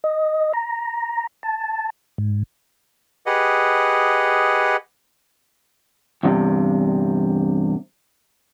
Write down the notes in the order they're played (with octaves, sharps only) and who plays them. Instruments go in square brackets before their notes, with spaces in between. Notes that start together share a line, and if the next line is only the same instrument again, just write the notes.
[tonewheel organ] D#5
A#5
A5
G#2
[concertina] G4 G#4 B4 D#5 F#5
[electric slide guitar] E2 G2 C3